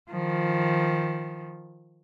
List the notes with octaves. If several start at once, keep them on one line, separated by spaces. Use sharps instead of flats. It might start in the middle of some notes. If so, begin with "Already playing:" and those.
D#3 F3